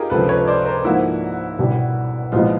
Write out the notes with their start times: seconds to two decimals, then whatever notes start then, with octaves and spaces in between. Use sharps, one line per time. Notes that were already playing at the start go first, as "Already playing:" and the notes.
Already playing: D#4 F4 G4 G#4 A#4
0.10 C#2 C3 F3 A4 B4
0.29 B4 C#5
0.47 C5 D5
0.65 A#4 C5
0.84 G#2 F3 A#3 E4 F#4
1.59 C2 B2 G3
2.32 C2 A#2 F3 G#3 B3 D#4 F4